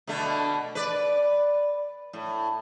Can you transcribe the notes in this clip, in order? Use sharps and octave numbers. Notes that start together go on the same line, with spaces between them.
B2 D3 A3
B4 D5
A2